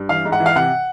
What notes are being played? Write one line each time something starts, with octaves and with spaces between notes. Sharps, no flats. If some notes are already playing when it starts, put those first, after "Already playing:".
Already playing: G2
E3 F5
G#2
F#5
E3
F5
C3 F#5